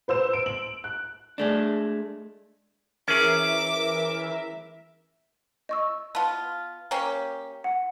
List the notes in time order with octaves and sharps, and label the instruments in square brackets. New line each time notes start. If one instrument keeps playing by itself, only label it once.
[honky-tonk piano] B4 C5 E6 E7
D7
F#7
F#6
[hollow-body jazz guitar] G#3 A3 D4
[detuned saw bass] E3 [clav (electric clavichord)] C#4 G#4 [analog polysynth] A#4 E5 [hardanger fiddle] D6
[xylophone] D#5 C#6 E6
[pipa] B3 F4 [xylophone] A5
[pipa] A#3 C#4 G4
[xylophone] F#5